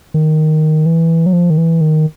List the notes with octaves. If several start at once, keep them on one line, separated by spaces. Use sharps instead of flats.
D#3
E3
F#3
F3
D#3
E3
D#3